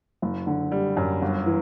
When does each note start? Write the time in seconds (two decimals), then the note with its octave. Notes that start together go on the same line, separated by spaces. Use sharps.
0.22 F#1
0.47 D3
0.72 G3
0.97 F#2
1.22 G1
1.46 E3